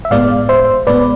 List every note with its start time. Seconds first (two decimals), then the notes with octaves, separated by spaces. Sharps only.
0.05 E5
0.11 A2 G#3 B3 D5 F5
0.49 C5 E5
0.87 A2 G#3 B3 B4 D5